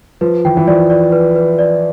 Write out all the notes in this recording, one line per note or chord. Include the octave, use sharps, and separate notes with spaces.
F3 B4
E3 G5
E3
F3 D5
D5
B4
B4
D5